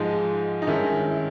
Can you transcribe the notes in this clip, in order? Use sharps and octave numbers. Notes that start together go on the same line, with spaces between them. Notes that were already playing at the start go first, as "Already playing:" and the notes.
Already playing: G#2 F3 G#3 D#4
D#4
G2 D#3 G#3 C#4 E4
E4